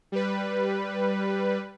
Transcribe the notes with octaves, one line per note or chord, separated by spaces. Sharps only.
G3 B4